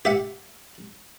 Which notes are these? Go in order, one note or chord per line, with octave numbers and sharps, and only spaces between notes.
G4 E5 F#5